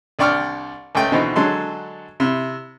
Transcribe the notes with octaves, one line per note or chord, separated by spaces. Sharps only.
C2 D4 D5 G5 C#6 F6
C#2 A3 G5
B2 D3 E3 C4 D#4
D3 F#3 G#3 A4 C6
C3 E4